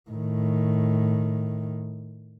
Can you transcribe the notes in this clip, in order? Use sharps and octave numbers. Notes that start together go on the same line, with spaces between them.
A2 D#3